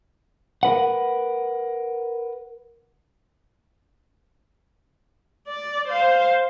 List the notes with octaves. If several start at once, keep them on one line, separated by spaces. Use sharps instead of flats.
A#4 B4 F#5
D5
C5 F5